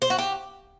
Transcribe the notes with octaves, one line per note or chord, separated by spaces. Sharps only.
C5
F#4
G4